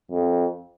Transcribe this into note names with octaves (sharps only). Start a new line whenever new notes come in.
F2